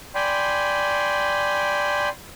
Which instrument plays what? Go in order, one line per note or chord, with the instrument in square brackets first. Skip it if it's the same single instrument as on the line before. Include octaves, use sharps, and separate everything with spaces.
[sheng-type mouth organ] D5 G5 G#5 B5 C6